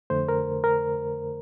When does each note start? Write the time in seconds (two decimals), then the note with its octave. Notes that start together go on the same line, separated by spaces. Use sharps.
0.10 F2 D3 A3 C5
0.29 A#4
0.64 A#4